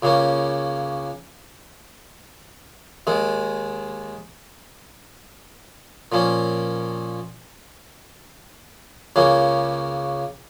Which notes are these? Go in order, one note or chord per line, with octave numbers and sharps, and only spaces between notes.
C#2 C#3 A#3 C#4
D#2 D#3 G#3
A#2 F3 A#3 C#4
C#2 C#3 A#3 C#4